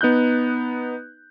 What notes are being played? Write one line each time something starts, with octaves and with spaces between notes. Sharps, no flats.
B3 D#4 F#6 G6